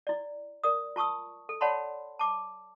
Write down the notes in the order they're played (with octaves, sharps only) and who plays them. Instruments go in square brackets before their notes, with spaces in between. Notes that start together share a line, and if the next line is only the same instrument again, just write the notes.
[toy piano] E4 D5
A#4 D5 D#6
F4 A5 C#6 D#6 E6
A4
C#5 D5 F#5 A5 B5 C6
A5 D6